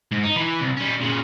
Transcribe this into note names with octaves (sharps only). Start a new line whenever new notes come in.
G#2
D#4
E3 B4
C2
G3 C#4
A#2 C#3